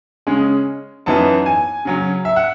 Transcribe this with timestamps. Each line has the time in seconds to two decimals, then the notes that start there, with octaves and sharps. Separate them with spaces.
0.27 C#3 G#3 C#4
1.06 F#2 E3 B3 D#4 A5
1.46 G#5
1.85 C#3 F#3 C#4
2.25 E5
2.36 F#5